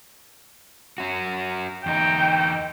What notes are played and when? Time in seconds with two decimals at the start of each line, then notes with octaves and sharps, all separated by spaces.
0.98 C#4 F#4
1.86 E2 D#4 G5